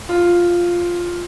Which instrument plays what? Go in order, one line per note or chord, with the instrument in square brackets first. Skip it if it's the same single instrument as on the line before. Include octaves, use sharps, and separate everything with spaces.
[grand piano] F4